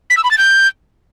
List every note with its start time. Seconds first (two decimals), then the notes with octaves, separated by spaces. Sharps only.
0.10 B6
0.17 E6
0.24 B5
0.31 A6
0.38 G6